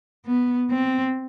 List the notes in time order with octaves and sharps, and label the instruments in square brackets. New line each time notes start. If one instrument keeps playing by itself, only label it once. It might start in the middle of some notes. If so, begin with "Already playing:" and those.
[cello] B3
C4